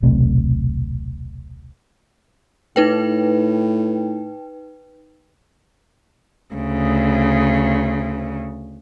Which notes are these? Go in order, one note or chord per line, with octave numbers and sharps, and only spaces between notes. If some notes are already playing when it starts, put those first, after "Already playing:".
D#1 B1 C3 A3
A2 D#4 B4 G5
D2 C#3